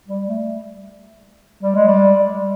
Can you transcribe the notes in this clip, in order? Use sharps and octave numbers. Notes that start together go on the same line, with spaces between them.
G3
A3
G3
G#3
G3
G3